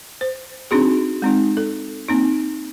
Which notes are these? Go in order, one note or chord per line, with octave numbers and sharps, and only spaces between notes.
C5
C4 D4 D#4 F#4 G#4
G#3 C4 D#4
A4
A#3 C4 D#4